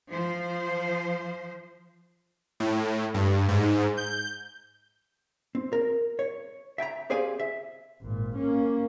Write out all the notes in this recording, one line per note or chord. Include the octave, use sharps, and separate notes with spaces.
F3 C5
A2
G2
G#2
G6
C4
A#4
C#5
E5 G5 G#5 A#5
G4 G#4 C5 D5 F5 G#5
E5
G#1 A#2
A#3 C#4